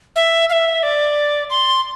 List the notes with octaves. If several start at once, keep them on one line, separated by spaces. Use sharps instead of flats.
E5
F5
E5
D5
C6